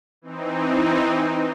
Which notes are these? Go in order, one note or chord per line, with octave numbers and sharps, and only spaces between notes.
E3 C4 D#4